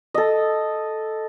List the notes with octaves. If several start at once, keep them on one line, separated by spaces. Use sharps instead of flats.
A4 D#5